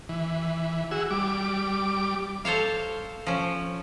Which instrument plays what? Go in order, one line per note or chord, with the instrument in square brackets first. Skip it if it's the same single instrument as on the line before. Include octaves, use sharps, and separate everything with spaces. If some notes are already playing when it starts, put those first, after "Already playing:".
[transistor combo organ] E3
F#4 G#4 E6
G3 D6
[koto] A4 C5 C#5 F5
F3 C#4